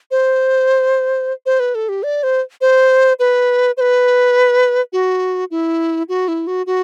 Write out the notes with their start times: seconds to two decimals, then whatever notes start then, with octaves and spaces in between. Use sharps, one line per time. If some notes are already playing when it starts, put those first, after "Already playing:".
0.11 C5
1.46 C5
1.60 B4
1.75 A4
1.89 G4
2.03 D5
2.23 C5
2.61 C5
3.19 B4
3.77 C5
3.81 B4
4.93 F#4
5.51 E4
6.09 F#4
6.28 E4
6.47 F#4
6.66 F#4